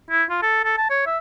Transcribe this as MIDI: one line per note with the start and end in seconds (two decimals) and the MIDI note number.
0.10 0.24 64
0.30 0.42 65
0.42 0.62 69
0.64 0.77 69
0.78 0.88 81
0.90 1.03 73
1.06 1.18 76